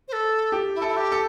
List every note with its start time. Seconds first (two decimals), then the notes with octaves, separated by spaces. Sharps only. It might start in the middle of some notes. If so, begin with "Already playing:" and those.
0.08 C5
0.13 A4
0.52 G4
0.75 E4
0.82 A4
0.88 E4
0.97 G4
1.12 A4